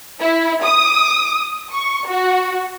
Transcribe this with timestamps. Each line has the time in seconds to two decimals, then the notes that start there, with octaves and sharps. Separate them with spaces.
0.20 E4
0.64 D#6
1.73 C#6
2.09 F#4